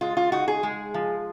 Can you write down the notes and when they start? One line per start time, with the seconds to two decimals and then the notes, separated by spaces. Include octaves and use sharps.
0.01 G#3 F4
0.17 F4
0.32 D#4 F#4
0.48 G#4
0.63 G#3
0.94 F3